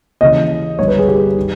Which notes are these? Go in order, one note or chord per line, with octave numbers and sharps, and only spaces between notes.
D#2 C#3 E3 D#5
G1 G2 D#3 C#5
B4
G#4
G4
D#3